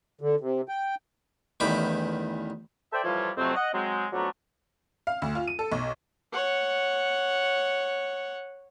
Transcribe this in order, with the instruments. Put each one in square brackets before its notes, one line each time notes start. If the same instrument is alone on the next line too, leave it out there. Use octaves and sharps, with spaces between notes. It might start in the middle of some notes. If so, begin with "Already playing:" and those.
[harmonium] D3
C3
G5
[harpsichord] A1 E2 D#3 G3 B5 D6
[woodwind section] A4 C5 D5 E5 G5
E3 F3 G3 F4 A4 C#5
F2 C3 F#3 A3 C4
D#5 F#5
F#3 G#3 C4
F2 F#3 A3 B3 D4 A#5
[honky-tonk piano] F5
D2
F4
D#7
A4
B1
[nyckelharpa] C#5 F#5